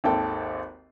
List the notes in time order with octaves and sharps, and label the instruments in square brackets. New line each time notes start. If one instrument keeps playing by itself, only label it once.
[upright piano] G#1 D#2 A4 G5